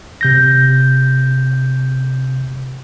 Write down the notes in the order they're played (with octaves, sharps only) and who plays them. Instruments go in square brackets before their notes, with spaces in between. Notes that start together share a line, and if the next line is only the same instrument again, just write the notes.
[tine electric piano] C3 G6 A#6